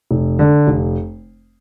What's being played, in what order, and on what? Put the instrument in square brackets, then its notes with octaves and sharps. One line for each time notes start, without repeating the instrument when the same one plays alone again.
[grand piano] F1
D3
F1